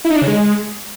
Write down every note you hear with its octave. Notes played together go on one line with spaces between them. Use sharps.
E4
D#4
D4
C#3
G#3